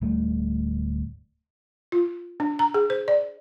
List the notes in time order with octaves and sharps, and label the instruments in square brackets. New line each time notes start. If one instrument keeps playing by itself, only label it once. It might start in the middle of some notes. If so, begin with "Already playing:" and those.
[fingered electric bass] D1 G3 A3
[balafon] F4
D4
A#5
G#4
C5
D5